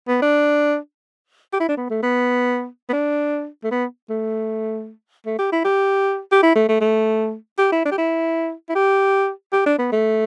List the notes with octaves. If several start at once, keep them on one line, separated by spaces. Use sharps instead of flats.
B3
D4
G4
E4
D4
B3
A3
B3
B3
D4
A3
B3
A3
A3
G4
E4
G4
G4
E4
A3
A3
A3
G4
E4
D4
G4
E4
E4
G4
G4
D4
B3
A3